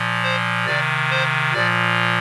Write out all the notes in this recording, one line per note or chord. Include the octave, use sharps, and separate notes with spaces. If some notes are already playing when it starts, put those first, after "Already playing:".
Already playing: A#2 F3
C5
C3 D#3 D5
C5
A#2 F3 D5